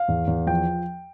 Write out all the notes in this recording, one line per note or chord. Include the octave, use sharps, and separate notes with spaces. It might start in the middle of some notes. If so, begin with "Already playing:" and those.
Already playing: F5
E2
E2
F3 G5